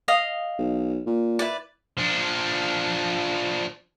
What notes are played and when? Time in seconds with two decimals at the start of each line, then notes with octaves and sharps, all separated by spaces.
0.08 D#5 F5 D#6
0.59 B1
1.07 A#2
1.39 E4 B4 D5
1.97 F3 D4